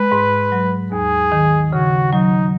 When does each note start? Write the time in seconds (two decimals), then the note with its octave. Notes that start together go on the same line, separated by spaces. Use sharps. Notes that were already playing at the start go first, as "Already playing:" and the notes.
Already playing: G#3 B4
0.12 G#2
0.52 F#3
0.92 D#2 G#4
1.32 D#3
1.73 C#3 F#4
2.13 F#3 D#4